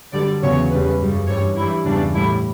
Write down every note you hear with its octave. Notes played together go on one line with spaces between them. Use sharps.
F#2 D3 G3 D5
E2 C#3 F#3 C#5
E2 C#3 G3 B4
F#2 C#3 G3
G2 E3 G3 C#5
G2 E3 G3 E4
E2 C#3 E3 G3 D4
A2 G3 E4